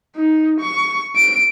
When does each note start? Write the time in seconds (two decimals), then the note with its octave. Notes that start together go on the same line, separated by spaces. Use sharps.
0.16 D#4
0.60 C#6
1.16 D7